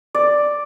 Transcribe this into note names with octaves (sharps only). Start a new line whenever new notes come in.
D5